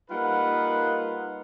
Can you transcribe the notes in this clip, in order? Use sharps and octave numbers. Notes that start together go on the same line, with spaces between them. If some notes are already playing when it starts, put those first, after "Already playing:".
G3 A#3 D#4 F4 B4 F#5